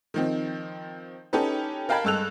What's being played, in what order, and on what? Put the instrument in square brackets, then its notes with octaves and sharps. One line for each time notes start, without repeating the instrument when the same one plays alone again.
[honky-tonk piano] D#3 F3 C4
C#4 D#4 G4 A4 B4
A#4 F5 G5 A5 B5 G#6
G2 G#3 A4 E6 F#6 F7